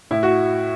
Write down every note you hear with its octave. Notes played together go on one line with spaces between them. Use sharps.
A2 E4
F#4